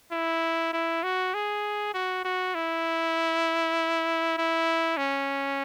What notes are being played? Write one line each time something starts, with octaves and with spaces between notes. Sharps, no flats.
E4
E4
F#4
G#4
F#4
F#4
E4
E4
C#4